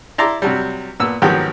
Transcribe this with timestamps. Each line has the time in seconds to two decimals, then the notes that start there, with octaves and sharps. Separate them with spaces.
0.18 E4 D5 A#5 C6 D6
0.42 C3 F#3 G3
1.00 A#2 B3 E6
1.22 G#1 D#3 F3 F#3 B3 G4